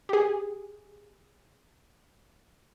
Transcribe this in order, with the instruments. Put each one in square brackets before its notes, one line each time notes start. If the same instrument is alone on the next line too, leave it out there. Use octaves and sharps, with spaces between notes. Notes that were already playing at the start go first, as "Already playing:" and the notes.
[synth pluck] G4 G#4